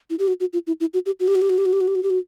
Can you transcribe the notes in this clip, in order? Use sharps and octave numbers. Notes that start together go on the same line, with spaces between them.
E4
G4
F#4
F#4
F4
E4
E4
F#4
G4
F#4
G4
F#4
G4
F#4
G4
F#4
G4
F#4
G4
F#4
G4
F#4